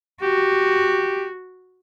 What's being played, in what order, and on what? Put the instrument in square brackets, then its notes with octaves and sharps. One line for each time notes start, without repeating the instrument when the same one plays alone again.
[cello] F#4 [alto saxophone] G4